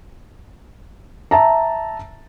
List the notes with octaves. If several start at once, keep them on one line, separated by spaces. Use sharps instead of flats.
E5 A5 A#5